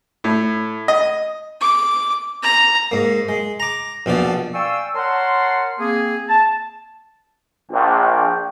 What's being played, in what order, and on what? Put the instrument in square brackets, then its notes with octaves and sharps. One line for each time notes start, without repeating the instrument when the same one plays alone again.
[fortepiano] A2
D#5
[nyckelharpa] D6
A#5
[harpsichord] G#2 A#3
G#3
A#5 D6
A#1 B2 F3 D5
[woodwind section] D5 F5 G5 G#5 C#6 E6
A#4 C#5 F#5 A5 A#5 C6
A#3 C4 G#4
A5
[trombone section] A#1 [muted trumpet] G5